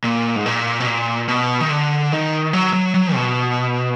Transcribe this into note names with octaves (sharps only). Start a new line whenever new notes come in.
A#2
G#2
A#2
B2
A#2
B2
D#3
D3
D#3
F#3
F#3
F#3
B2